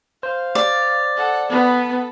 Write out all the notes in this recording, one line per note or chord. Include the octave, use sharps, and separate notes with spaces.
C5 F5
D5
A4 F#5
B3 A4 B5